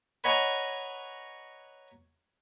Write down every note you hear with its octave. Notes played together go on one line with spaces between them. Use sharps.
B4 C#5 D#5 F#5 G#5 A#5